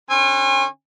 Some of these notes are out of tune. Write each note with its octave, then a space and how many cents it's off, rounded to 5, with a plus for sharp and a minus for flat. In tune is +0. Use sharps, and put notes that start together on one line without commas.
D3 +0 C#4 -35 G#5 -35